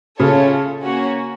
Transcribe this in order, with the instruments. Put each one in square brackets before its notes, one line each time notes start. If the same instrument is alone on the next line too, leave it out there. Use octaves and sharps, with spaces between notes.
[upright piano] C#3 [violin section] A3 C#4 F4 A4 C#5
[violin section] A#3 C#4 F#4